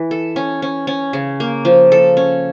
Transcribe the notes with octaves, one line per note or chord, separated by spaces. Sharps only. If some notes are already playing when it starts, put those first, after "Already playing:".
Already playing: E3
A4
C#4
C#4
C#4
C#3
A#3
F3
A4
C#4